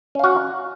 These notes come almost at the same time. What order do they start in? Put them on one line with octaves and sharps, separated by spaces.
C#4 F5 F#4